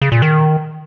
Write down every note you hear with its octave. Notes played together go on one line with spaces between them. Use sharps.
C#3
A#2
D#3